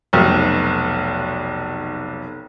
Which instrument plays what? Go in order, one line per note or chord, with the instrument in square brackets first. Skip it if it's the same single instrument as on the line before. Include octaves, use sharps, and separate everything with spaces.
[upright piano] F1 B1